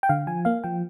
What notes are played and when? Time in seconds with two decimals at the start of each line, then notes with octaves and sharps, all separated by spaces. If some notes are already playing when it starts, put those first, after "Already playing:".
0.03 G5
0.09 D3 F5
0.27 F3 G#5
0.45 A#3 F5
0.64 F3 G5